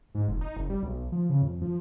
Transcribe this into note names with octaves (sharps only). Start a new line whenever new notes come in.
G#2
F1
D#4
F#1
G3
B1
F3
C#3
F2
F3